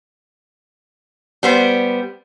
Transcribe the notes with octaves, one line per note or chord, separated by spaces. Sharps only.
G3 B3 C5